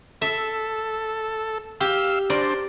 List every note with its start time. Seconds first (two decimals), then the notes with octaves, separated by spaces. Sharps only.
0.22 A4 E5
1.81 G4 F5 E6
2.30 D4 A#4 C5 D5